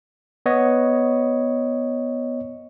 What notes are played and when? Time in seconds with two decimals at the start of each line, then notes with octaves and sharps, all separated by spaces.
0.46 B3 C#5 D#5